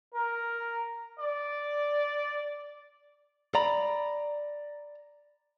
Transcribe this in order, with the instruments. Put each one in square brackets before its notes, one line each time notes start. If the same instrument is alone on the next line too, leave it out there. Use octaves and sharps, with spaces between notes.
[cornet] A#4
D5
[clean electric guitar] D5 A#5 B5